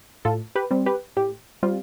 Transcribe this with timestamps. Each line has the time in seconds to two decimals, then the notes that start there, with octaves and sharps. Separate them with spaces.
0.25 A2 F4 A4
0.55 G4 B4
0.71 G3 C4
0.86 G4 B4
1.16 A2 G4
1.63 G3 C4 F4